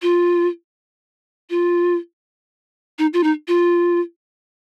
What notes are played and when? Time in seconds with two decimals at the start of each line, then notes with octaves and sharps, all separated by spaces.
0.02 F4
1.50 F4
2.99 D#4
3.13 F4
3.24 D#4
3.48 F4